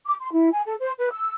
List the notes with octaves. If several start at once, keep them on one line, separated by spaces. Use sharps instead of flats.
D6
C6
E4
G#5
A4
C5
B4
E6